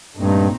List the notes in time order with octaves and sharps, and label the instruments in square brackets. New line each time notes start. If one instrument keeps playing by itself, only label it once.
[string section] A#1 A#2 A3 C4 D#4 [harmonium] G2